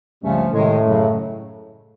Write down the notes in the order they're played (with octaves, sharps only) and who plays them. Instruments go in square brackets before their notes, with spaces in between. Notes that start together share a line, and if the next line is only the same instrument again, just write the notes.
[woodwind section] C#2 C#3 F3 A3 C#4 [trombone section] G2 G3
[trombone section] A2 A3 [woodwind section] C3 D#3 G#3
[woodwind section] F#2 C#3 F#3